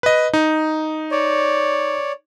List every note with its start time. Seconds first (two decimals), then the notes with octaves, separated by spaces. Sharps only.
0.03 B4 D#5
0.33 D#4
1.11 C#5 D5